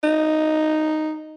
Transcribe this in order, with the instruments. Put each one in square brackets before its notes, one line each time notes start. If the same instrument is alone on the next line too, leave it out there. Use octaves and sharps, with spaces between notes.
[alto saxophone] D#4